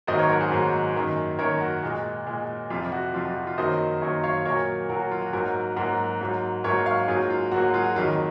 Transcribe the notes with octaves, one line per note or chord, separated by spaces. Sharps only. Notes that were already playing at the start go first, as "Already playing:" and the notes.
G#2 D#3 F#3 A#3 C5 D#5
A#4 C#5
F#4 A#4
G#4 C5
G#2 D#3 F#3 A#3
F#2 D#3 A#3
F#2 D#3 A#3 A#4 C#5
F#4
A#2 G#3
A#2 G#3
F2 C3 F3 F4
F#4
F2 C3 F3 F4
F#4
F#4
F4
F#2 D#3 F#3 A#3 C5 D#5
F#2 D#3 F#3 A#3 A#4 C#5
C#5 F5
A#2 F#3 A#3 A#4 C#5
A#2 F#3 A#3 F#4 A#4
F#4
F4
F#4
G#2 F#3 A#3 F#4 A#4
G#2 F#3 A#3 F#4 A#4
G#2 F#3 A#3
G#2 F#3 A#3 A#4 C#5
C#5 F5
G#2 F#3 A#3 F4 G#4
F4
G#2 F#3 A#3 F#4
F#4
F4 G#4
F#4
F2 D#3 F#3 A#3 F4